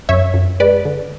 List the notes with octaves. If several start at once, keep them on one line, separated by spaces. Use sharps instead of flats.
F#2 C#5 E5
F#2
G#3 B4 D5
D3